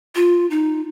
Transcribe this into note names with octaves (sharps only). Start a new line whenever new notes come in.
F4
D#4